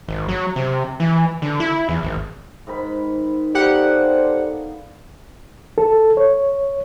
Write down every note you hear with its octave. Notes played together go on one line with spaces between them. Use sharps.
G#1
F#3
C3
E3
D3
E4
E2
G#1
G#2 D#3 B5
B3 G4 A4 C5 D5 F5 F#5 A#5
A4
C#5